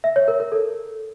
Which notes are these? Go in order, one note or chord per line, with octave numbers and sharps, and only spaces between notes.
E5
C#5
A#4
A#4
A4